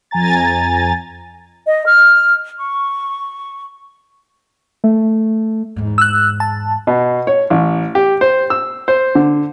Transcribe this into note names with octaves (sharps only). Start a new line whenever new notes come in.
F2 G#5 A#5 A6
D#5
F6
C#6
A3
E2 G#2
E6 F#6
A5
B2
C#5
A1
G4
C5
E6
C5
D3